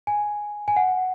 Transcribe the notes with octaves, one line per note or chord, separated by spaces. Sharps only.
G#5
G#5
F#5